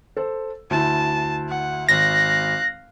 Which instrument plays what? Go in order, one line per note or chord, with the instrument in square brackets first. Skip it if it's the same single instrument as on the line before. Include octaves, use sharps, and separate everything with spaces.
[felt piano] A4 C5
[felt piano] D2 E4 [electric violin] A5
[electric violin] F#5
[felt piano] G#1 [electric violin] F5 F#6 [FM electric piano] A#6